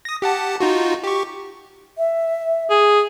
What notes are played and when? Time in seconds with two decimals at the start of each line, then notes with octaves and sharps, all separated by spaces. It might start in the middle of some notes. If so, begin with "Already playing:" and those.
0.05 D#6 A#6
0.22 G4 F#5 A5
0.60 D#4 F4 F#4
1.04 G4 C#6
1.98 E5
2.70 G#4